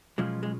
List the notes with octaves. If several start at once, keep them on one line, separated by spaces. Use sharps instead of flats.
B2 F3 F#3 G#3 C#4 F4
G#3